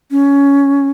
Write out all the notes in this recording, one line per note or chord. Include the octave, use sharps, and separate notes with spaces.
C#4